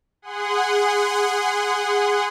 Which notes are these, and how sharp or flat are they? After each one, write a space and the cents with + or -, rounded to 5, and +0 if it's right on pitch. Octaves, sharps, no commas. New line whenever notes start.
G#4 -15 F#5 +0 C6 -30